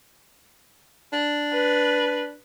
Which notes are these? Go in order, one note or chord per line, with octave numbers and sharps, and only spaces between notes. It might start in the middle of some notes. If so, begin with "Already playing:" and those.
D4
B4